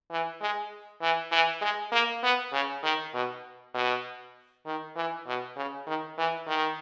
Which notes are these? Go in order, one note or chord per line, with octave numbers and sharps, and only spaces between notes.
E3
G#3
E3
E3
G#3
A#3
B3
C#3
D#3
B2
B2
D#3
E3
B2
C#3
D#3
E3
D#3